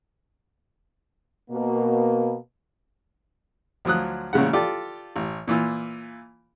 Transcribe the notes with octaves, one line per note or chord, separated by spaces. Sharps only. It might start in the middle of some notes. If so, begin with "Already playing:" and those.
B2 A#3
D2 F3 F#3 D#6 F#6
A1 A#2 C#3 G#3 F#5
F4 G4 A4 D5
A1
A#2 E3 F4 E6